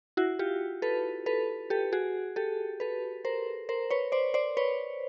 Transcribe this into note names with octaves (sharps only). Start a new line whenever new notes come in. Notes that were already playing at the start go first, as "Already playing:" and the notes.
E4 F#4
F4 G4
A4 B4
A4 B4
G4 A4
F#4 G#4
G4 A4
A4 B4
A#4 C5
A#4 C5
B4 C#5
C5 D5
C5 D5
B4 C#5